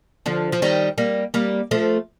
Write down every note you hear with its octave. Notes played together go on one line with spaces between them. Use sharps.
D3 F3
F3
D#3 G3
G3 A#3
G3 A#3
F3 A3